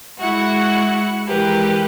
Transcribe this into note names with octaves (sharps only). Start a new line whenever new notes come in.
G#3 E4 F#4 F#5
E3 G#3 G4 A#4 B4